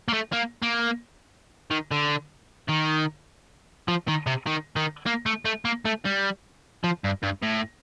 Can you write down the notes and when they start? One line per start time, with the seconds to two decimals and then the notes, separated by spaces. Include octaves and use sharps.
0.08 A#3
0.13 A3
0.32 A#3
0.62 A#3
1.71 D#3
1.91 D3
2.69 D#3
3.88 F3
4.08 D#3
4.27 C3
4.47 D#3
4.76 D#3
5.06 A#3
5.26 A3
5.45 A3
5.65 A#3
5.85 A3
6.05 G3
6.84 F3
7.04 G2
7.23 G2
7.42 A2